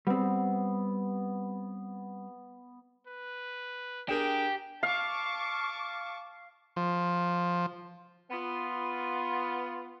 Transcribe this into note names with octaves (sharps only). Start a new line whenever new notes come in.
G3 B3 C4
B4
D4 G4 G#4 A#4 G5
F5 A5 C#6 D6
F3
B3 F4